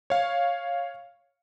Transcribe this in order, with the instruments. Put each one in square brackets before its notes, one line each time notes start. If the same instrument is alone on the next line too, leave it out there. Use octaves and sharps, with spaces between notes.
[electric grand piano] C#5 F5